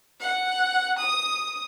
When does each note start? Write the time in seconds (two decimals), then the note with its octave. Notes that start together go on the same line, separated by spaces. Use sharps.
0.20 F#5
0.99 D#6